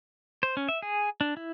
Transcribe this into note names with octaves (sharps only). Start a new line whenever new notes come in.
C5
C#4
E5
G#4
D4
E4